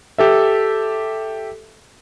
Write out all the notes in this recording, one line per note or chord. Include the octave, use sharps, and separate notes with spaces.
G4 A4 E5